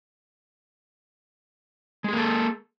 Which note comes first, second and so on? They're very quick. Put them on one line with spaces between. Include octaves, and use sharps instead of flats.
G#3 G#4 A#3 A4